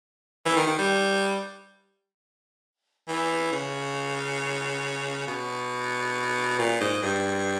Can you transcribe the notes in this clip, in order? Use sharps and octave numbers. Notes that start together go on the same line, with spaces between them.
E3
D#3
D#3
G3
E3
C#3
B2
A#2
G#2
G2